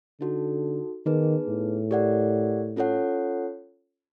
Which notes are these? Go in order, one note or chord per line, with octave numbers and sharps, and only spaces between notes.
D3 D#4 F#4 A4
D#3 B3 D#4 G#4 B4
A2
G4 A#4 D5 F#5
C#4 F4 A4 C#5 F#5